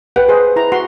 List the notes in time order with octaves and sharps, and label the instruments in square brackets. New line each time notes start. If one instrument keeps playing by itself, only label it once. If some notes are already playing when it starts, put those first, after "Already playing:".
[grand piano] B4 [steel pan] F#5 G5
[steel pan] G#4 C5 D#5
E4 A#5
F#4 F#5 C6